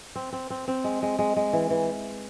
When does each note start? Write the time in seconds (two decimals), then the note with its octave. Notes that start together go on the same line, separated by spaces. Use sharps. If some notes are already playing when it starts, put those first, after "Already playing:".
0.15 C4
0.32 C4
0.50 C4
0.68 C4
0.84 G#3
1.02 G#3
1.19 G#3
1.36 G#3
1.53 E3
1.70 E3